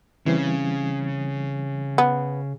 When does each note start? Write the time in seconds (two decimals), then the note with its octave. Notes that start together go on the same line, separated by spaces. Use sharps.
0.26 C#3 E3 G3 C4
1.98 B3